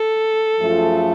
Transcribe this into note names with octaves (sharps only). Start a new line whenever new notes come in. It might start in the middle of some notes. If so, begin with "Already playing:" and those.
Already playing: A4
F#2 F3 A3 F4 G#4